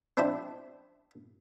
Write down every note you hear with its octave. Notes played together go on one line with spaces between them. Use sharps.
C4 D4 E4 C5 D5